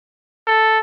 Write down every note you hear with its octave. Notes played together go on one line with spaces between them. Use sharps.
A4